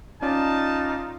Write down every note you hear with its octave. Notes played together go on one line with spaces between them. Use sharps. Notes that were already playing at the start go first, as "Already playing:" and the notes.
C#4 D#4 F4 D5 A5